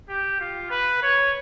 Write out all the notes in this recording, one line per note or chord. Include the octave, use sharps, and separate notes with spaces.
G4
F4
B4
C#5